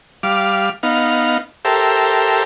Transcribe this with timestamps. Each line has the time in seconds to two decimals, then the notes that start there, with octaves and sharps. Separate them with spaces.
0.23 G3 F5 D6
0.83 B3 D#4 F5
1.65 G4 A4 A#4 C5 E5